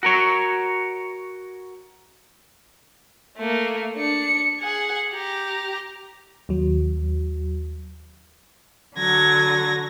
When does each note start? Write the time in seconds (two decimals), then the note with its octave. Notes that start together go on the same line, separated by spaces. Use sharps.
0.03 F#4 A#4 C#5
3.37 A3 A#3
3.96 D4 C#7
4.61 G#4 F#5
5.12 G4 A#5
6.49 D#2 F#3
8.97 D3 F#3 G#6 A#6